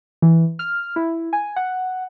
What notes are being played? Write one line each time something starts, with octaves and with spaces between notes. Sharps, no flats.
E3
F6
E4
G#5
F#5